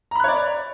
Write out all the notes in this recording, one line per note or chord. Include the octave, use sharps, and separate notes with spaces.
C#5 D5 A#5 B5 F#6